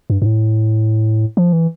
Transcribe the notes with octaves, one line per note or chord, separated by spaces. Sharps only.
G2
G2
A2
F3
E3